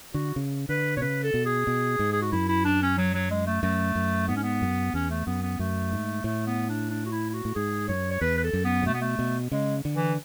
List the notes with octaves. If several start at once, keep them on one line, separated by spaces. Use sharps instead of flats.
D3 F#4
C#3
D3 B4
B2 C#5
C#3 B4
A4
B2
G#4
B2
G#2
G#4
F#4
F#2 E4
E4
D4
C#4
F#3
F#3
G#3
A3
F#2 A3
F#2
G#2 B3
C#4
B3
F#2
E2 C#4
A3
F#2 B3
B3
F#2 A3
G#2
A2 A3
B3
D4
D4
F#4
E4
E4
F#4
A2
G#2 G#4
F#2 C#5
C#5
E2 B4
B4
A4
F#2
B3
C#3
B2 A3
B3
A3
B2
C#3 G#3
D3
E3